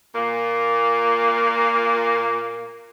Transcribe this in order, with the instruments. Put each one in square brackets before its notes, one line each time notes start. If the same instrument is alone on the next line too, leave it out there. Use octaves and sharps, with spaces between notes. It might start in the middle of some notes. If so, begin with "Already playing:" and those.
[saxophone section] A#2 A#3